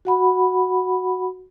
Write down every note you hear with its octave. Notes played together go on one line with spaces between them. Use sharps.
F#4 F#5 B5